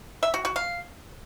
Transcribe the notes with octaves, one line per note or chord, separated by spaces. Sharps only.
E5
F#4
F#4
F5